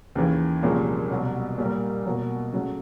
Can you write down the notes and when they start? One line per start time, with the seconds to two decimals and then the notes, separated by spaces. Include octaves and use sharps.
0.15 D#2 C#3 E3
0.63 C2 A#2 F3 G#3 C#4
1.10 C2 B2 F#3
1.58 A#2 G3 A#3
2.06 B2 F#3 A#3
2.53 C#3 F#3 A3